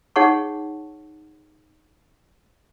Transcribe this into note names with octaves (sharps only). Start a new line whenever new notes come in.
D#4 G#4 C#5 F#5 A5 C#6